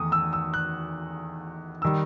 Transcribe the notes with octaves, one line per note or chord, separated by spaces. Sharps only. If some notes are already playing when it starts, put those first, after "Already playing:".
Already playing: E2 D#3 A3 D#6
E6
E6
F#6
D#3 G3 E6